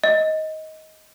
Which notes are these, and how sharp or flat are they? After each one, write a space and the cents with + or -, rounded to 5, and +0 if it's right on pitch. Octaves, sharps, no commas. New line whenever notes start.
D#5 +15